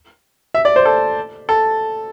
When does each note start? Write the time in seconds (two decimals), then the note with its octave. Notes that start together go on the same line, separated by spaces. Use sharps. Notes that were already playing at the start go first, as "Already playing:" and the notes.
0.54 E5
0.65 D5
0.76 C5
0.85 A4
1.49 A4